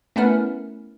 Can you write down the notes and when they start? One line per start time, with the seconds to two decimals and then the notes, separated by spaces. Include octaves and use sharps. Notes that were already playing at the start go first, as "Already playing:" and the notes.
0.16 A3 B3 C#4 E4 A#4 B4